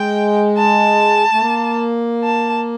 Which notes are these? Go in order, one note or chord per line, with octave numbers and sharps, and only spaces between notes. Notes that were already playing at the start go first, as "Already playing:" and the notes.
Already playing: G#3 G5
A5
A3
A#3
A5